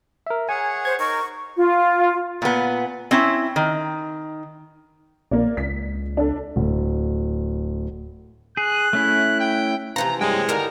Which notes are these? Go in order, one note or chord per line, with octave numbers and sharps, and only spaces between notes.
A#4 E5
G#4 C#5 F#5 G#5
C5 G#6
D#4 A#4 C#6
F4
A#2 B3
C4 C#4 E4
D#3
A#1 A#3 D5
C#2 B6
D4 A4
D1
G#4 F#6
A3 C#4 E4
G5
C3 E3 F3 A#5
G2 G#3 C#5 G5
D3 D#3 G3 A#4 A#5